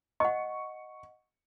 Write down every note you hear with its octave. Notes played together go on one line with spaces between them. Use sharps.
D#5 F#5 C#6